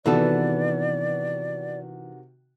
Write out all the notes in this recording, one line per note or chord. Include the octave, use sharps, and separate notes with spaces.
C3 D#3 E3 B3 F#4 A4 D5